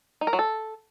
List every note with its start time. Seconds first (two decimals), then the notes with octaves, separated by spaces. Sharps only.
0.21 D#4
0.27 A#4
0.33 F#3
0.39 A4